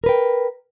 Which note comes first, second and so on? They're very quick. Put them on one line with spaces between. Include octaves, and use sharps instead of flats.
A#4 B4 G5